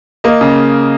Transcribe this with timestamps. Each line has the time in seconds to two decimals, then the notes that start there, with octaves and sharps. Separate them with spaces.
0.24 A#3 D#5
0.41 C#3